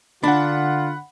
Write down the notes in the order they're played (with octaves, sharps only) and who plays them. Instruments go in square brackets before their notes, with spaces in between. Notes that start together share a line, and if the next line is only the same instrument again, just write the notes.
[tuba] D3 [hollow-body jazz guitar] D4 [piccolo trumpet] F4 [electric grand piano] F#5 B5